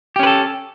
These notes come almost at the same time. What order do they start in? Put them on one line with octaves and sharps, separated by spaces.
G4 C#4 B4 A4